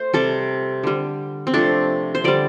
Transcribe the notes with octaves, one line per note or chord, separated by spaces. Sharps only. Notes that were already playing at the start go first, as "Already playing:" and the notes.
Already playing: A3 C5
C3 G3 A4
D3 G3
C4
C3 F3 A3 D4
C5
D3 G3 D5